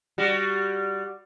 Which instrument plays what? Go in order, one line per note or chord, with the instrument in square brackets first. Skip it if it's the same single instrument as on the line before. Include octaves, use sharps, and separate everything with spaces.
[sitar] G3 F#4